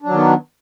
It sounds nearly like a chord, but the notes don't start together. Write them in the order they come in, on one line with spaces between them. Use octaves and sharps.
D4 F#3 D#3 B3